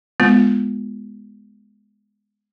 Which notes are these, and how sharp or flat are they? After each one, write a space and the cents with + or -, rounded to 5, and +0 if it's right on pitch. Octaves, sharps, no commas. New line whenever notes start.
G#3 +0 B3 +0 F4 +0